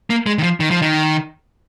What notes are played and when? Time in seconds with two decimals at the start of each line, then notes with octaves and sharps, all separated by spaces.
0.10 A#3
0.26 G#3
0.38 D#3
0.43 F3
0.60 D#3
0.71 F3
0.82 D#3